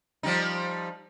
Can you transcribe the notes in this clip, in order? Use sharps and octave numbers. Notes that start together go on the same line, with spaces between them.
F3 G3 D#4